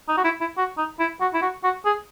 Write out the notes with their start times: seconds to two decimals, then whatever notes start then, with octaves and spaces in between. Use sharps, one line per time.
0.08 D#4
0.18 F#4
0.24 E4
0.41 E4
0.58 F#4
0.78 D#4
0.99 E4
1.21 F#4
1.34 E4
1.42 F#4
1.64 F#4
1.86 G#4